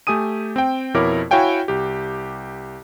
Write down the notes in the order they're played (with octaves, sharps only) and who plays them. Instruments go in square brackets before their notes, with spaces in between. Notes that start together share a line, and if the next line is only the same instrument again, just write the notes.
[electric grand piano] A3 G4 G#5 D#6 D#7
C4 G5
F2 B2 E4 A#4 C#5 D6
E4 F#4 C#5 F5 G5 G#5
C2 G4